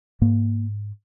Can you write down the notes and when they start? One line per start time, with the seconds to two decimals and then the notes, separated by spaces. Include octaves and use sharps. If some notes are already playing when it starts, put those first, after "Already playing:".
0.21 G#2 A#3